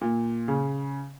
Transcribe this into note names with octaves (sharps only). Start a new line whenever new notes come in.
A#2
C#3